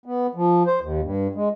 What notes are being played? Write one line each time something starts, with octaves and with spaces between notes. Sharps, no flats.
B3
F3
C5
D#2
G2
G#3